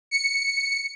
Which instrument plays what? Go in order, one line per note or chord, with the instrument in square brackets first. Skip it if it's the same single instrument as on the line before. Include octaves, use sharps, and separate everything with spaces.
[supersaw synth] C#7